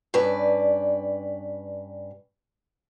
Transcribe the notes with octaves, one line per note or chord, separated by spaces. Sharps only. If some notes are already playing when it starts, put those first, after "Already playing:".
G2 C#4 B4 D5